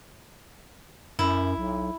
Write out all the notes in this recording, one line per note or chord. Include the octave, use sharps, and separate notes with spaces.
F#2 E4
B1